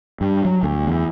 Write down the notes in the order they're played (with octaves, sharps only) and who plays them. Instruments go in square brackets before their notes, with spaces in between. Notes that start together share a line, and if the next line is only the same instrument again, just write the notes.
[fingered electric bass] G2
F#3
D2
E2